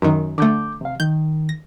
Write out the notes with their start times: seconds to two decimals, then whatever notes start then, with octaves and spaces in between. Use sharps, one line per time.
0.02 F#2 D#3
0.38 D3 A3 D6 G6
0.81 C3 F5
1.00 D#3 G6
1.49 A#6